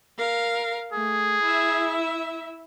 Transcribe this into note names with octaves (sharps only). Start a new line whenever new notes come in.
A#4 F5
A3 G#4
E4 E5